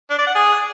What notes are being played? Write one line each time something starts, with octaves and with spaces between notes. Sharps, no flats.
D4
D5
F#5
G#4